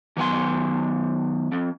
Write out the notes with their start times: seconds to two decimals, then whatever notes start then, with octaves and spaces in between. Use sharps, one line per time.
0.17 D#3 F#3 B3 F#5 G#5 C6
1.52 F2